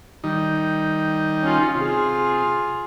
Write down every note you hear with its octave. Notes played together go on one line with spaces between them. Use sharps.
D#3 G3 D#4
C#4 F4
C3 F4 G#4